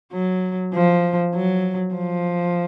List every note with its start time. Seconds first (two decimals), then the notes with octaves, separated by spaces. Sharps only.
0.13 F#3
0.74 F3
1.34 F#3
1.95 F3